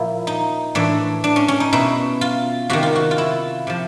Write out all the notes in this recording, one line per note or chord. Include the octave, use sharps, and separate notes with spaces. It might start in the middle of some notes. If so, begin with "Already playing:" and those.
Already playing: A#2 F3 E4
D#4
A2 E3 D4
D4
C#4
C#4
D#4
B2 E4
F4
C3 D#3 F#4
F4
F#4
F4
E4
C3 F3